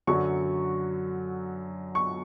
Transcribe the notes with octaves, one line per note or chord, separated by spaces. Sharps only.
F#2 D3 F#3 C#6
C#6